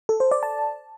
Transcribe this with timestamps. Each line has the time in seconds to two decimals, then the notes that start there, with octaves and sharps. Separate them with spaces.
0.09 A4
0.20 C5
0.31 D5
0.43 A5